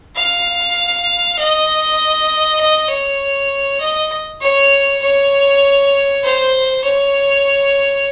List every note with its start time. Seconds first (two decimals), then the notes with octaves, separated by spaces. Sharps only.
0.16 F5
1.39 D#5
2.60 D#5
2.90 C#5
3.81 D#5
4.41 C#5
5.02 C#5
6.23 C5
6.84 C#5